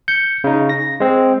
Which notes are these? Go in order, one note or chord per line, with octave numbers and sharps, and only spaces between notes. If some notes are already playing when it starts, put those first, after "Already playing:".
G6 C#7
C#3 D#4
A#6
G#3 C4